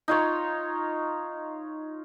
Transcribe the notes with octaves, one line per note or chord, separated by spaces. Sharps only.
D#4 F4 C#5